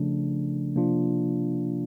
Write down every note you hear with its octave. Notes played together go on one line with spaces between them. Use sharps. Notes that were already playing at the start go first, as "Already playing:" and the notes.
Already playing: C#3 F3 A3 D4
C3 F3 A#3 D4 F4